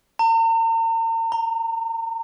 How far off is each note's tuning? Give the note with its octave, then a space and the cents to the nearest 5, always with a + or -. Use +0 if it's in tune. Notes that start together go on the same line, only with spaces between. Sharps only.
A#5 -45
A#5 +0